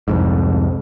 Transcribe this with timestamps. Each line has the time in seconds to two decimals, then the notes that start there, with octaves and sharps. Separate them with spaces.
0.08 C2 F2 G#2